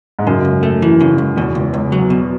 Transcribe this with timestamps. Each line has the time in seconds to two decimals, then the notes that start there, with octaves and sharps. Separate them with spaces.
0.19 G#2
0.27 F#2 C#3
0.45 C#2
0.63 A3
0.82 E3
1.00 C#3
1.18 C#2
1.37 E2 B2
1.55 C#2
1.74 C#2
1.92 F#3
2.10 B2